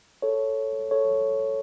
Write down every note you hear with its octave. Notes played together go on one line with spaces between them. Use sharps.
A4 C#5
A4 C#5